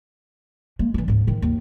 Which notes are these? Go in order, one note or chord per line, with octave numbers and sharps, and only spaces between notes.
G#3 A#3
E3 D4
D2 G#2
G#2 D#3
D#2